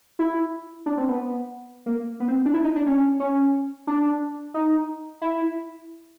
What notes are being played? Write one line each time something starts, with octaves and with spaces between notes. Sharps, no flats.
E4
D4
C4
B3
A#3
B3
C4
D4
E4
D#4
D4
C#4
C#4
D4
D#4
E4